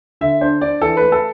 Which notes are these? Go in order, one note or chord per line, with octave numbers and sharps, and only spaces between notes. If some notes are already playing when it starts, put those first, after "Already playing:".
D3 E5
D4 C5
D4 D5
E3 A4
A3 B4
A4